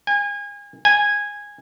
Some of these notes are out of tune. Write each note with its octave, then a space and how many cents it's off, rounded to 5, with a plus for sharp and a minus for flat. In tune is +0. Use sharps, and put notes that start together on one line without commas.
G#5 -30
G#5 -10